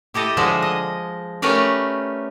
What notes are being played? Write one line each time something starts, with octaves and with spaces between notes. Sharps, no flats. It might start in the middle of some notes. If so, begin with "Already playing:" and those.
E4 G4 A4 D#5
D3 F3 G#3 G#4 E5
D#5
A3 C#4 G4 A#4 B4 D5